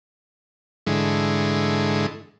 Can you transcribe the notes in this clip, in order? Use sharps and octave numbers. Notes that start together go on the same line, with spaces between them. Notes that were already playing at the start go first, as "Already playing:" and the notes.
G#2 D3 E3 G#3 A3